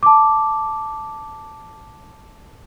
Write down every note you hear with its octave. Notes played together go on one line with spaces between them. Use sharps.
A5 D6